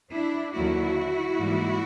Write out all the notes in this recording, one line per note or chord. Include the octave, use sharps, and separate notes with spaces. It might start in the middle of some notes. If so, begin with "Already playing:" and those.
D4 E4
D#2 D3 F#3 A#3 E4 F#4
G#2 E3 G3 A#3